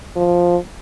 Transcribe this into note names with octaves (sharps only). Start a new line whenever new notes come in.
F3